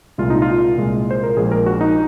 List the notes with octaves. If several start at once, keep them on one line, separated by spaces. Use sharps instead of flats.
C2 A#2 G#3 F4
D#4
F4
C2 A#2 G#3
C5
A#4
A#1 A#2 G#3 G#4
A#4
F#4
D#4